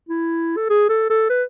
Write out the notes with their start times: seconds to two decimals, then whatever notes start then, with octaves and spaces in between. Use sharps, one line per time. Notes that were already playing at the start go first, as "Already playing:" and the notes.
0.09 E4
0.57 A4
0.70 G#4
0.89 A4
1.10 A4
1.30 B4